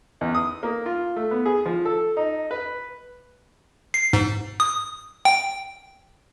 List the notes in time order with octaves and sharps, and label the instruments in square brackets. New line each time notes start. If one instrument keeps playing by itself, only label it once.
[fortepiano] E2
D#6
A#3
F4
A3
B3
G#4
F3
A4
D#4
B4
[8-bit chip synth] C7
G#2
D#6
G5